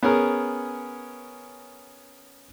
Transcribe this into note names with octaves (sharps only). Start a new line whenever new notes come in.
B3 C#4 G#4 A#4